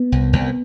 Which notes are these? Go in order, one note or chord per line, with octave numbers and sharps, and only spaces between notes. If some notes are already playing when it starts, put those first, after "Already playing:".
Already playing: B3
C2
C2